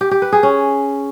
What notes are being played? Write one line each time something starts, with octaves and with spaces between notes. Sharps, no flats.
G4
G4
B4
G#4
C#4